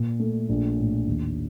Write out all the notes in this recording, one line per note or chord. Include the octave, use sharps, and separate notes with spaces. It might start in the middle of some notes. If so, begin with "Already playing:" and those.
Already playing: A#2
A3
A#1
A2
D#2